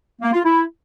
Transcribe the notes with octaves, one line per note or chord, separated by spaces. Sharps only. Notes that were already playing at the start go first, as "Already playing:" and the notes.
A#3
F4
E4